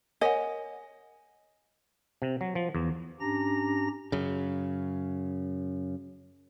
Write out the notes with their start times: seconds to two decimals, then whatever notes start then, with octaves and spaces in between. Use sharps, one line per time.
0.21 A#4 C#5 D#5 F#5 G#5
2.22 C3
2.41 F#3
2.55 F3
2.75 E2
3.20 G#2 C#4 D4 G4 A#5 A#6
4.12 F#2 C#3